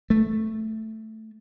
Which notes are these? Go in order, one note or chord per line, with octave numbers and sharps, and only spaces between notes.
A3